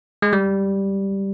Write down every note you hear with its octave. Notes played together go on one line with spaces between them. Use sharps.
G#3
G3